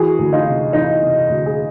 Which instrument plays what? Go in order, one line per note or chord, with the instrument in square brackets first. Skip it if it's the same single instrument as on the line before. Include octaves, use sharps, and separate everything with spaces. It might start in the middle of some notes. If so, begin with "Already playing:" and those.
Already playing: [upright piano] E3 F#4 G#4
D2
D#4 F4
C3
E3 D#4 F4
C3
D2
G#4